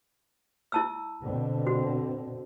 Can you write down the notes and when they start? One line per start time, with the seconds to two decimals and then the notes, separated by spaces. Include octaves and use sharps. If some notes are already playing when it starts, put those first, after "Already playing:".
0.72 E4 A5 E6
1.22 B2 D3 C4
1.67 F#4